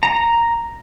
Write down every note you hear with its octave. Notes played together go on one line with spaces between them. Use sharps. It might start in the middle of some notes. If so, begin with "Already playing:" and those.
A#5